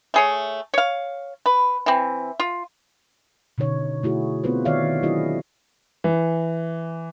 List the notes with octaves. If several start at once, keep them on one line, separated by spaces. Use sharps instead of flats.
A3 G#4 C#5
C#5 F5
B4
E3 C4
F4
B2 D3 D#4 C#5
A3 E4 F#4 G#4
B3 C4 F4 B4 C5
D#3 F4 C#5 D5 E5 F5
F#3 D4 E4 F#4 G#4 D#5
E3